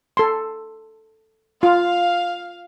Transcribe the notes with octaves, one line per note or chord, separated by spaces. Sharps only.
A4 C6
F4 F5